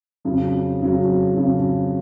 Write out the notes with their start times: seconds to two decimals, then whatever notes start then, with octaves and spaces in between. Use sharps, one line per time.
0.25 F2 C#3 F#3
0.79 F2 C#3 F#3
1.34 F2 C#3 F#3